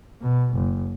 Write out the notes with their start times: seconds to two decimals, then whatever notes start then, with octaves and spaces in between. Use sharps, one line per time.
0.22 B2
0.54 F#1